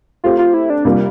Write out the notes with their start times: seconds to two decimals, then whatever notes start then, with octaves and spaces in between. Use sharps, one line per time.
0.24 A3 C4 F4 G4
0.39 F4
0.54 E4
0.70 D4
0.85 C3 G3 A#3 D4 F4